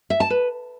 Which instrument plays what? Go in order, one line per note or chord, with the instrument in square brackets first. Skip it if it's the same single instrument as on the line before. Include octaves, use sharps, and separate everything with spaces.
[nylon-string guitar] E5
A5
B4